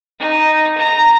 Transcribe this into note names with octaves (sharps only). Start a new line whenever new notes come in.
D#4
A#5